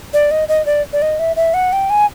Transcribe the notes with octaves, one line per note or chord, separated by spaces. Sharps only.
D5
D#5
D#5
D5
D5
D#5
E5
E5
F#5
G5
G#5